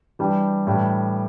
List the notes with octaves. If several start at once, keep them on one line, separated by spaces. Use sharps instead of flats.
E3 G3 D4 G4
A2 E3 G3 D4 G4